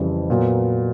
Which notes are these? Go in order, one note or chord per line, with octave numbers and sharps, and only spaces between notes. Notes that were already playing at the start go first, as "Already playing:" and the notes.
Already playing: F2 C#3 E3 G3
A#2 F#3 B3